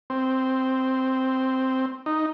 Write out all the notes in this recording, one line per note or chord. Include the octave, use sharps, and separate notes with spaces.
C4
D#4